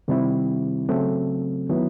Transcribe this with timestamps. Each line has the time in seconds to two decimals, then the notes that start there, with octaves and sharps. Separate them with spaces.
0.08 C3 D#3 G3 C4 E4
0.89 C#3 F#3 A3 C4
1.70 D#3 F#3 B3 E4